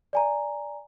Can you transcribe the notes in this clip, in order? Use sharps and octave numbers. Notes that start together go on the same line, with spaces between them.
D5 G#5 A#5